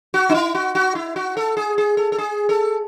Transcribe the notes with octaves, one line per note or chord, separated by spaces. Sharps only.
F#4
D#4
E4
F#4
F#4
E4
F#4
A4
G#4
G#4
A4
A4
G#4
A4